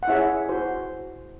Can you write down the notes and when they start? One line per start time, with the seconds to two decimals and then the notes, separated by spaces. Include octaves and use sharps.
0.03 F#5
0.08 E4 G#4 C#5 E5
0.49 F#4 C5